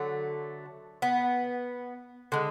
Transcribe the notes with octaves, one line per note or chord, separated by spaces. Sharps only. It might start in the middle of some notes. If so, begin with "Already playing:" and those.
Already playing: D3 F#3 A3
B3
D3 G#3